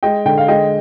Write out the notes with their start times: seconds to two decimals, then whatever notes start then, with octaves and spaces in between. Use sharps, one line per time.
0.03 G#3 D#5 G5
0.25 D3 G5
0.38 F5
0.48 G#3 D#5 G5